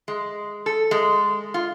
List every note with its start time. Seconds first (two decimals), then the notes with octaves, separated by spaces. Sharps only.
0.08 G#3
0.66 A4
0.91 G#3
1.54 F4